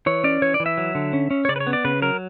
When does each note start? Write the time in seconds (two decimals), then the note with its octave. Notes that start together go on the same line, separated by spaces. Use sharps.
0.06 E3 C#5
0.24 C#4 D5
0.42 E3 C#5
0.54 D5
0.60 E3
0.66 E5
0.77 F#3
0.95 D3
1.13 C#4
1.31 C#4
1.45 C#5
1.49 C#3 D5
1.56 B4
1.60 C#5
1.67 B3
1.73 D5
1.85 C#3 B4
2.02 F#3 A#4